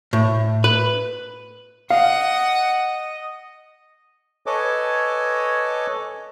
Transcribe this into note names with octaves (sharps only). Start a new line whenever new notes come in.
A2
B4
D#5 F5 F#5
A4 B4 C#5 D#5 G#5 D6